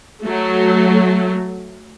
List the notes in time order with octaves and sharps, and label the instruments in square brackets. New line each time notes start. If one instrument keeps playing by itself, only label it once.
[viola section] F#3 A3